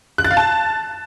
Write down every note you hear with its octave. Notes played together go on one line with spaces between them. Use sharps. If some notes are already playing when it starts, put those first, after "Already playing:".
F#6
A6
F5
A5